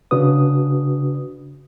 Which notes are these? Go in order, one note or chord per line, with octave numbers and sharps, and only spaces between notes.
C#3 D4 F#4 B4 D#6